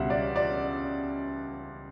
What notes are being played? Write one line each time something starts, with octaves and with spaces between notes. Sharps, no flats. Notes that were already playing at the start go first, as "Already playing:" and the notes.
Already playing: C#2 B2 G3 E5 F#5
D5
D5